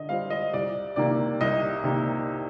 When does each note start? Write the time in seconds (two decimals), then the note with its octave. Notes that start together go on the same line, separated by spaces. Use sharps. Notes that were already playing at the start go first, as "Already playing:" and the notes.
Already playing: D3 D#5
0.09 G3 C4 F4 F5
0.30 D#5
0.53 C2 D5
0.96 C3 D#3 A#3 D5
1.41 C2 D#5
1.84 C3 D#3 A#3